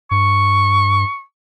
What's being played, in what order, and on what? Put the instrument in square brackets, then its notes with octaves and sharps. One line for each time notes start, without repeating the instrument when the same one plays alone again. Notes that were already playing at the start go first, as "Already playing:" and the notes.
[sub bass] G2 [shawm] C#6